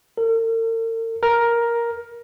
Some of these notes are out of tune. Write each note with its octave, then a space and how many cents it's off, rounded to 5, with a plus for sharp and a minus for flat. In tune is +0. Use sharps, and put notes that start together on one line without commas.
A#4 -45
A#4 +10